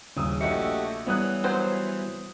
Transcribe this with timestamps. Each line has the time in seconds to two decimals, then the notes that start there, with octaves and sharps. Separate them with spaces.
0.16 D#1 C#3 D#6 E6
0.41 A#1 A3 F#4 G4 D#5 E5 A5 C#7
1.07 E3 G3 B3 C#5 D#6 F#6
1.44 F#3 C5